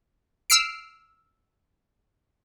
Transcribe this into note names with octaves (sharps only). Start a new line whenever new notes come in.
E6 F6 C7 D7